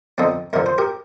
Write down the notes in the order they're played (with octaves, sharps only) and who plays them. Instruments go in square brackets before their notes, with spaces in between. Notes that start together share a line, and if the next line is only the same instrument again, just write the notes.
[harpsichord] F2 D3 F3 C4 D#4
F2 D3 F3 A#4
C5
G4 A#4